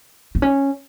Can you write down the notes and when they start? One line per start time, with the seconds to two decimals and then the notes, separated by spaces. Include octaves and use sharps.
0.35 C4
0.42 C#4